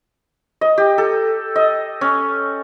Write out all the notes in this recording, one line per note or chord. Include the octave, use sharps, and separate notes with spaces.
D#5
G4
A4
D#5
C#4